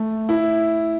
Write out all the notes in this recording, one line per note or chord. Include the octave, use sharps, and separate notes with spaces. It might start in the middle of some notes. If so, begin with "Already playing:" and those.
Already playing: A3
E4